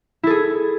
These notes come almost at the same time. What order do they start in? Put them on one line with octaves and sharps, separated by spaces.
E4 A4 G#4